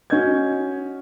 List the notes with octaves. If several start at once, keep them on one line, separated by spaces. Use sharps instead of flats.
C#4 F#4 D#5 G6 G#6